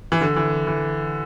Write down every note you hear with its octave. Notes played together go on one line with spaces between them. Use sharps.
E3
D3
E3
E3